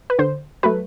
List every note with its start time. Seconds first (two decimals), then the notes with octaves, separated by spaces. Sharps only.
0.10 B4
0.19 D3 C5
0.63 F#3 A3 B4